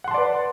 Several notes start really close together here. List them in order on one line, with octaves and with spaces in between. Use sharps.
F#5 C6 A5 D5 B4